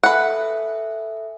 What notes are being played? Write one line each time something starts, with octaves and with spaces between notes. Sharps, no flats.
A4 B4 E5 F#5 G#5